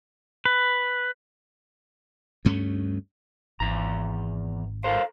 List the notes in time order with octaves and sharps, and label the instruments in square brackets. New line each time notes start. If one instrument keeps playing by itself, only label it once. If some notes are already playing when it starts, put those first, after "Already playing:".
[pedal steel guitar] B4
[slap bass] D2 G2 A3 C#4
[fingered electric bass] G#1 [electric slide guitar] E2 A#5
[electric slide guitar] A4 A#4 C5 [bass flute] F5